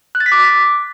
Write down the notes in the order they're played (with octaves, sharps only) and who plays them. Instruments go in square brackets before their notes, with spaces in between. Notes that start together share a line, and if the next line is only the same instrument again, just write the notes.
[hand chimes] F#6
A6
B6
D6